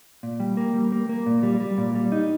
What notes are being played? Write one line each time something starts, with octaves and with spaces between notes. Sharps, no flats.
A#2
G3
A#3
G3
A#3
A#3
A#2
G3
G3
A#2
G3
D#4